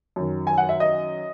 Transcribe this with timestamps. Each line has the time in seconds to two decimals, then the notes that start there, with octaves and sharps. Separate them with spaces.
0.16 F#2 D#3
0.47 G#5
0.58 F#5
0.69 E5
0.80 D#5